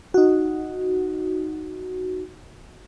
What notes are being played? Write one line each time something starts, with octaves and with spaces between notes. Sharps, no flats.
D#4 F#4